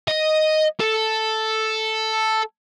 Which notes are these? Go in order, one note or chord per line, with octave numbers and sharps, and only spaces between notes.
D#5
A4